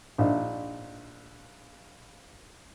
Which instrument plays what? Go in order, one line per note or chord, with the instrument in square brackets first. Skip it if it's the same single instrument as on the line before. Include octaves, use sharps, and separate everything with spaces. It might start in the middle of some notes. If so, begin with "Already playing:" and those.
[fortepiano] A#1 D4 D#4 E5